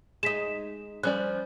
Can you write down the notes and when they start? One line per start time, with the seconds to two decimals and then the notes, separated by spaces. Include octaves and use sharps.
0.23 G#3 D#4 B6 E7
1.03 F3 G3 C#4 D5 F#6